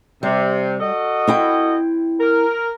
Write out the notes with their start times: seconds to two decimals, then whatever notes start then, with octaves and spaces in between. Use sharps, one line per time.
0.23 C3 G3
0.80 F#4 A4 D#5
1.27 C4 E4 G5
2.20 A#4